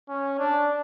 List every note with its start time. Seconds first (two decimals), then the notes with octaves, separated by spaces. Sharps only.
0.09 C#4
0.39 D4